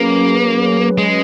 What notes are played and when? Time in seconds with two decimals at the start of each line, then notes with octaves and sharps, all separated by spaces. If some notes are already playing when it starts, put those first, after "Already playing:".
Already playing: F#3 A#3 C#4 G#4 B4
0.98 G#3